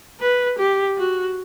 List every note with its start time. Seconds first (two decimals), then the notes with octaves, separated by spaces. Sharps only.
0.20 B4
0.58 G4
0.97 F#4